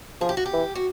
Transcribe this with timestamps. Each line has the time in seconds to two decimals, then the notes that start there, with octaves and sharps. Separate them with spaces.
0.21 F3 G#4
0.29 G4
0.37 F#4
0.46 G4
0.53 E3
0.75 F#4